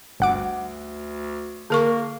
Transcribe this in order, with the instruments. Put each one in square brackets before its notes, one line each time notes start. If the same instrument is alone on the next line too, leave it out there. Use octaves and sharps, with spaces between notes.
[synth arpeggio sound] G1 F#5 D6 [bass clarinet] D2
[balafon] D3 A#4 C#6 [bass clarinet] A#3